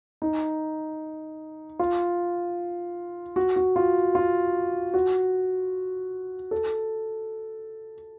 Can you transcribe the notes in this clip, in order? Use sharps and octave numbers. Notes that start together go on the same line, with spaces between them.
D#4
F4
F#4
F#4
F4
F4
F#4
A4